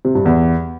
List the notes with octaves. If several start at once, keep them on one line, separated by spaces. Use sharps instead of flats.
C3
G2
E2